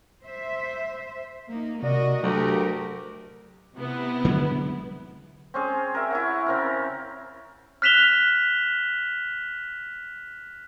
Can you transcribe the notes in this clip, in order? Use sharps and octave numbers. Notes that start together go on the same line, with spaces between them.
C5 E5
A#3 D#4
C3 F#4 A#4 D5 D#5
D2 F#3 A3 G4 A#4
C3 B3 E4
D3 F#3 G#3
C4 C#4 G#4
A#4 E5
E4 C#5 F#5
C#3 C4 A#4
F6 F#6 B6 E7 F7 G7